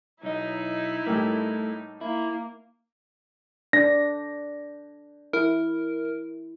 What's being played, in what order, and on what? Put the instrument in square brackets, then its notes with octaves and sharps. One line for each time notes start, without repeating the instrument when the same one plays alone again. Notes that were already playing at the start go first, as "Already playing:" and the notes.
[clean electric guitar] B1 D#5 [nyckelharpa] D#4 [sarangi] E4
[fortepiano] A2 G3 A#3 [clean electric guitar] A3
[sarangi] A#3 [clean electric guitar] E4
[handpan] D4 [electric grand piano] A#6
[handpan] E4 [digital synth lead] A#4